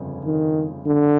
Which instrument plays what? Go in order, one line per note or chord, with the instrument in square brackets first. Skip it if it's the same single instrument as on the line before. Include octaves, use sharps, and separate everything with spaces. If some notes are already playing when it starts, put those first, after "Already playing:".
Already playing: [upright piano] G1 F2 C#3
[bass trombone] D#3
D3